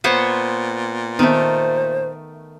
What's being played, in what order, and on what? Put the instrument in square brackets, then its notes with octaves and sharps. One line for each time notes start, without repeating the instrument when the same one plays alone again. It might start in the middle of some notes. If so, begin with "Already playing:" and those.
[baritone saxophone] A#2 [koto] B3 C5 C#5
[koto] D#3 A3 [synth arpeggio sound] B3 C4 D#4 [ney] C5